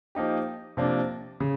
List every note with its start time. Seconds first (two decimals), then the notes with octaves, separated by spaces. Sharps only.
0.15 F3 A#3 D#4 G4
0.77 C3 F3 A#3 D4
1.40 C#3